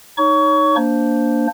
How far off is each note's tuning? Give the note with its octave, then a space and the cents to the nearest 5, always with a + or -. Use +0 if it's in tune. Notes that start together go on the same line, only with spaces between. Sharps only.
D#4 +0 C#5 +10 C#6 +25
A#3 +0 D4 -5 C5 +0